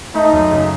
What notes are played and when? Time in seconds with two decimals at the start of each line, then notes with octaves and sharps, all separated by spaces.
0.15 A3 D#4
0.33 F#2
0.51 C#3